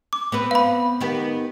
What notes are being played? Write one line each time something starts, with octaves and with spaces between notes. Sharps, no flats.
D6
B3 C4 B4
F5 B5
D#3 B3 G4